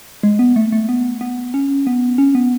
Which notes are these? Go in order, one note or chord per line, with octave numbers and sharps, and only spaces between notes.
G#3
B3
A3
A3
B3
B3
C#4
B3
C#4
B3